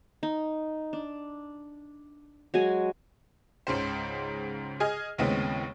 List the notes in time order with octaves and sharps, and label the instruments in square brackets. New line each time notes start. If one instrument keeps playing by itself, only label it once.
[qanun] D#4
D4
F#3 G#3 F#4 G#5
[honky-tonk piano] C#2 G#2 C#3 C5
G#4 D#5 G#5 F6
D#2 A2 C#3 G#3 B3 C4